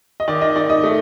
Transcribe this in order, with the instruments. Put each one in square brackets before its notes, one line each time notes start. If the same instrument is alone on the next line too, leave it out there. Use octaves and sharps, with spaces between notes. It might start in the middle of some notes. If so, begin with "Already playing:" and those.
[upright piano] D#5
D#3 D5
D#5
D#4 D5
D#5
A3